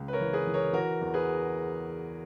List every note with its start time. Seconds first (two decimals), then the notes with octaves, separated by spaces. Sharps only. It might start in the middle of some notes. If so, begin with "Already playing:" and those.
Already playing: C#2
0.08 B4
0.13 A#4 C#5
0.20 E3
0.33 G#4 B4
0.47 E3
0.54 A#4 C#5
0.73 E3 F#4 A#4
1.01 E2
1.14 G#4 B4